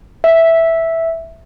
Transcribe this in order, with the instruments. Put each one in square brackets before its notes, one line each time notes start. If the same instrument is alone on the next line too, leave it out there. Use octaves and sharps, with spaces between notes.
[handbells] E5